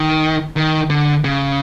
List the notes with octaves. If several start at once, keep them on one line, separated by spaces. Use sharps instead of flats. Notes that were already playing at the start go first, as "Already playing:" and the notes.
Already playing: D#3
D#3
D3
C#3